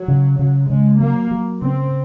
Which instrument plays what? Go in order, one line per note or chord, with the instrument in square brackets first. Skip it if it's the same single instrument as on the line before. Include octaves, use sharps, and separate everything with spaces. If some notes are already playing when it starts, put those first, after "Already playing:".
Already playing: [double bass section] F#3
[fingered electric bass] C#3
[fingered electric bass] C#3 [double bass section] F#3
[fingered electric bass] C#3 [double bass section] G#3
[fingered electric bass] F#3 [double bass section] A#3
[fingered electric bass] F#3
[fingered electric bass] C#3 [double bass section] C4